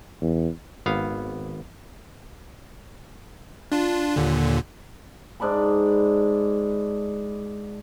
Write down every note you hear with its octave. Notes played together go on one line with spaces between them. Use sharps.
E2
G#1 B3 F5
D4 F4
D#2 A#2 D3
G#2 D4 D5 B5